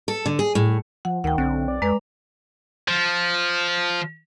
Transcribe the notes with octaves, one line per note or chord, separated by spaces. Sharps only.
A4
D3
G#4
A2
F3 F#5
D2 D#3 F#5 G5
B1 D3 C4
D5
F2 G#3 B4 A#5
F3